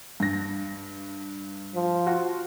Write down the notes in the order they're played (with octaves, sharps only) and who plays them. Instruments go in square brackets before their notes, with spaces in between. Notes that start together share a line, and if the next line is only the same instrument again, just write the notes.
[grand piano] G2 A#6
[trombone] F3
[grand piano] F4 F#4